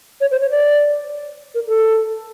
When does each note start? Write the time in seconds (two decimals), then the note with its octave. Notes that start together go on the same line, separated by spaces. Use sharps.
0.21 C#5
0.31 C5
0.41 C#5
0.51 D5
1.54 A#4
1.67 A4